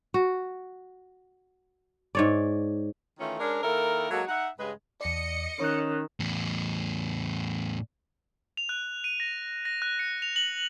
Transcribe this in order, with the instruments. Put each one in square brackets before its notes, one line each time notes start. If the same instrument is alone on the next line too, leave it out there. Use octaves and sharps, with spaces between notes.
[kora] F#4
G#2 C#5 D5
[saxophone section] D#3 E3 A3 C#4 F4
G#3 C#4 D4 A#4
D#3 A#3 E4 A4 A#4
F#3 G#3 A#3 F#4 A4
D#4 E5 F#5
G2 C#3 G#3 G#4 B4
[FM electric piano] E2 D5 [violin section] D#5 C#7
[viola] D#3 [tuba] C#4 [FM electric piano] C#5 F#6
[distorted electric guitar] E2 A2
[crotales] F7
F#6
D#7
A#6
A#6
F#6
C#7
F7
F#7